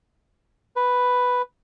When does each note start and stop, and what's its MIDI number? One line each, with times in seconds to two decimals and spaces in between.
0.76 1.42 71